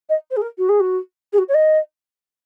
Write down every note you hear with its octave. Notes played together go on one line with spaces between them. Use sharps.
D#5
C5
G#4
A#4
F#4
G#4
F#4
G#4
F#4
C#5
D#5